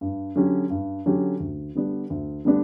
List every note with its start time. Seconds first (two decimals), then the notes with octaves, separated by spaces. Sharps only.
0.01 G2
0.36 D3 F#3 C#4 G4
0.70 G2
1.06 D3 F#3 C#4 G4
1.40 D2
1.75 D3 G3 B3 D4
2.10 D2
2.45 D3 G3 B3 D4